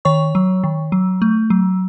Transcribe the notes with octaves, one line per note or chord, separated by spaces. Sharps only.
D#3 C#5 C#6
F#3
D#3
F#3
A3
F#3